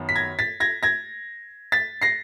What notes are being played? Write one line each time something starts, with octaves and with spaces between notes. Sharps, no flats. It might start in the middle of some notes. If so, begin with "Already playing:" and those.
Already playing: F#2 D#3 B3
B6
G#6 A#6
A6 B6
G#6 A#6
G#6 A#6
A6 B6
A#6 C7